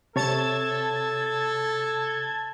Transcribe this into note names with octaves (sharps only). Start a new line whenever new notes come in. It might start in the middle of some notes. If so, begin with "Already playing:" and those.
C3 A4 C#5 A5 G#6 A6